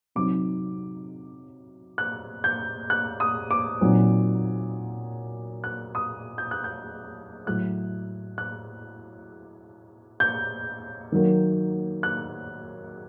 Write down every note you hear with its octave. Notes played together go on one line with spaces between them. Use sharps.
C3 F#3 C4 D#4 D6
F#6
G6
F#6
D#6
D6
A#2 F#3 C4 D#4
F#6
D#6
G6
F#6
G6
A2 F#3 A3 F#6
F#6
G6
D#3 F#3 A#3
F#6